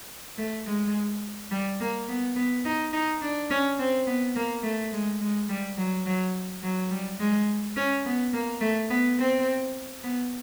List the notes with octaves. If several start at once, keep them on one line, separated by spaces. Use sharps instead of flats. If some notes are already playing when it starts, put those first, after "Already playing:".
A3
G#3
G3
A#3
B3
B3
D#4
D#4
D4
C#4
C4
B3
A#3
A3
G#3
G#3
G3
F#3
F#3
F#3
G3
G#3
C#4
B3
A#3
A3
B3
C4
B3